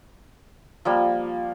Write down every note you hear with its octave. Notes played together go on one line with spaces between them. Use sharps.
F3 G3 A#3